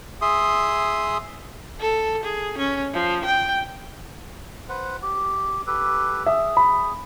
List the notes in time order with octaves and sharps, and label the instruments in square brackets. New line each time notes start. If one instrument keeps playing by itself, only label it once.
[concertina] G#4 E5 C6 D#6
[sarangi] A4
G#4
C#4
F3
G5
[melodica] B4 C5 F#5
G4
G4 A4 B4
[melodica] G#4 [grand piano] E5
[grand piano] B5